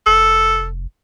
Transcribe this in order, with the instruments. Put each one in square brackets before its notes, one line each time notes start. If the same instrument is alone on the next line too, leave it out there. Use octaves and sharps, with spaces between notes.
[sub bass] F1 [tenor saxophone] A4